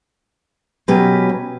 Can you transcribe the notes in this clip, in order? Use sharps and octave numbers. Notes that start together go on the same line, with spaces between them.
B2 F#3 C#4 G4 B4